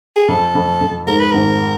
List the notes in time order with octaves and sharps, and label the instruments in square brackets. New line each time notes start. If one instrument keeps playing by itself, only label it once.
[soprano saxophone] G#4
[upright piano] F2 [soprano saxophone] A4
[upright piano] F2
F2
[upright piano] G#2 [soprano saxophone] A#4
[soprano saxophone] B4
[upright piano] G#1 [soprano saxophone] A#4